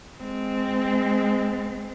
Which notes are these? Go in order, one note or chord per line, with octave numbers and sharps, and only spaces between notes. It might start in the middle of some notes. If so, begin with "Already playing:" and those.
G#3 C4